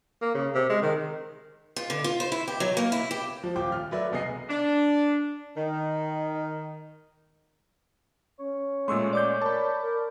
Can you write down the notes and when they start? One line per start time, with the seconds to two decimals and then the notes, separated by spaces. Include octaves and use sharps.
0.22 A#3
0.34 C#3
0.55 C3
0.70 G#3
0.82 D#3
1.76 F4
1.90 D3
2.04 F4
2.20 C5
2.32 E4
2.48 G4
2.60 F#3
2.77 A#3
2.92 E4
3.11 G4
3.43 F3
3.56 D#1 F3 F4 G5 D6
3.72 F6
3.91 F#3 A3 B4 D5 E5
4.12 E1 C2 B3 G#4 D#5 C7
4.49 D4
5.56 D#3
8.39 C#4 C#5
8.88 A#2 G#3 A3 C6 C#6 E6
9.13 D5 D6 G6
9.42 A#4 A5 B5
9.82 A#4